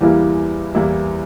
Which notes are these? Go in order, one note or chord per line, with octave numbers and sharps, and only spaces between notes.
E2 E3 G3 A#3 E4
E2 E3 G3 A#3 E4